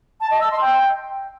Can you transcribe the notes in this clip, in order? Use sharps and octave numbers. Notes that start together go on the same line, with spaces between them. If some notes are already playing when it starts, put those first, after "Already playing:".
A5
D#5
E6
C6
G5